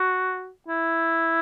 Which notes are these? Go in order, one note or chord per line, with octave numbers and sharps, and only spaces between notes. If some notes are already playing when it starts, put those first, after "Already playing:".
Already playing: F#4
E4